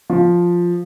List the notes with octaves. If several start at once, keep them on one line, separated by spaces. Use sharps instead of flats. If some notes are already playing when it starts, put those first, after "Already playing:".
F3